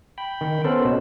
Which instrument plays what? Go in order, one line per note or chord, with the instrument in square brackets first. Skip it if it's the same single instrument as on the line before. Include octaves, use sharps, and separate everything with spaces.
[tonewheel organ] G5 B5
[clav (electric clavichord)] D#3
[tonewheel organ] B3 C#4 C5 [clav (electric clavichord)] A4 A#4
[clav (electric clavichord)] B2